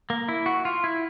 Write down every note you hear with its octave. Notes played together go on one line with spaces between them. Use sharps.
A#3
E4
F#4
F4
E4